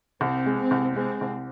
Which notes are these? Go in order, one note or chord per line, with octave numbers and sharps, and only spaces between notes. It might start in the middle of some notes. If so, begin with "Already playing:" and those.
C2 C4
G#3
C4
C2
G#3 C4
C2